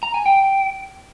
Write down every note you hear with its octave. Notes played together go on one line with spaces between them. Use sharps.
A#5
G#5
G5